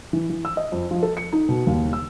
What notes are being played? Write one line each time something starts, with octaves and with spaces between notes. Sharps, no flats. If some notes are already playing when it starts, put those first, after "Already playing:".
E3
E3
E6
D#5
F2
F3
A4
C#7
D#4
B2
D#2
E6